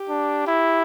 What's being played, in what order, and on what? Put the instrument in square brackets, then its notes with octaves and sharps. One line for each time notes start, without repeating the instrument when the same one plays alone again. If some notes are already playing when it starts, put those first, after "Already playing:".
Already playing: [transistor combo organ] G4
[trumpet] D4
E4